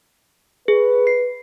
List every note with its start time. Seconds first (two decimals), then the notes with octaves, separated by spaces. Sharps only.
0.68 G#4 B4
1.07 C7